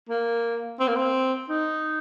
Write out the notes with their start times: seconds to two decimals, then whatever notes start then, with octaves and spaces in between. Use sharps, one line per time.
0.09 A#3
0.79 C4
0.88 A#3
0.96 C4
1.49 D#4